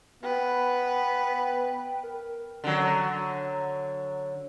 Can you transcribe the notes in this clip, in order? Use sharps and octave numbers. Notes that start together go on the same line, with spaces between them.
B3 B4 G5
A#4
D3 F#3